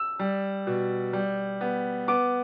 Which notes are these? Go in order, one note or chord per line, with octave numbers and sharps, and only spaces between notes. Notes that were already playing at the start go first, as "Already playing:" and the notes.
Already playing: E6
G3
B2
G3
B3
B3 D6